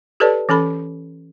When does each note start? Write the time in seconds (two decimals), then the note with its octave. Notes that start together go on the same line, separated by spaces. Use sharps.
0.20 G4 A4 B4 C#5 D5 A5
0.49 E3 C#4 A4 B5